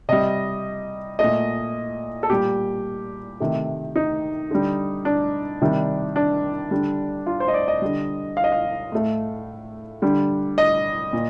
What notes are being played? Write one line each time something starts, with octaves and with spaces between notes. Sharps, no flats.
C3 G3 D#5
A#2 A3 D#5
A4
A#2 G3 G4
C3 D#3 A3
D#4
D3 G3
D4
C3 D#3 G3
D4
D3 G3
F4
C5
D#5
D5
D#5
D3 G3
F5
D#5
F5
A2 A3
D3 G3
D#5
A#2